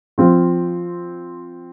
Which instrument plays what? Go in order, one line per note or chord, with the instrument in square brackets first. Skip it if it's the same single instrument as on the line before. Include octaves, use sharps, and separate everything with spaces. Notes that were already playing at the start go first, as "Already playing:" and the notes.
[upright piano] F3 C4 F4